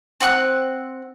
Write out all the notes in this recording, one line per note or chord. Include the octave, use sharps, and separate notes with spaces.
C4 F#5 C#6 F#6